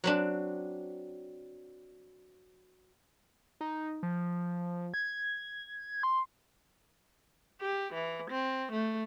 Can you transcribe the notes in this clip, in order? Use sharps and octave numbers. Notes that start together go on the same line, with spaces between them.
F#3 C4 D4
D#4
F3
G#6
C6
G4
E3
C4
A3